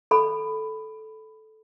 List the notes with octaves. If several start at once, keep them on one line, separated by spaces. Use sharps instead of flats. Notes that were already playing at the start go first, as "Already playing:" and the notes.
A4 B5